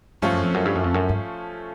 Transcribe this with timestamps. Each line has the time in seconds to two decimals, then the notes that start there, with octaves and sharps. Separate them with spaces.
0.22 G2 F3 A3 C#4 F4 A4
0.33 F#2
0.43 F2
0.54 F#2
0.65 G2
0.75 F#2
0.84 F2
0.94 F#2
1.09 G2